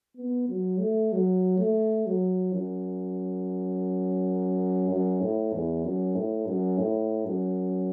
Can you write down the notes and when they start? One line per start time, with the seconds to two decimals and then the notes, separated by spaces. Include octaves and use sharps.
0.17 B3
0.49 F#3
0.80 A3
1.12 F#3
1.59 A3
2.07 F#3
2.54 F#2
4.90 F#2
5.21 A2
5.53 E2
5.84 F#2
6.15 A2
6.47 F#2
6.79 A2
7.26 F#2